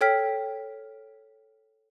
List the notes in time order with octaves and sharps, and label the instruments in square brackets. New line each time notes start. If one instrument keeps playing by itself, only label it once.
[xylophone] A4 C#5 G5 F6 B6